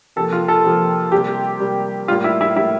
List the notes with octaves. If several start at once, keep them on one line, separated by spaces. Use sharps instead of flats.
C3 F3 A#3 A4
F4
A4
C3 F3 A#3
C3 G3 A#3 G4
C3 G3 A#3
A2 G3 A#3 F4
E4
E4
A2 G3 A#3 E4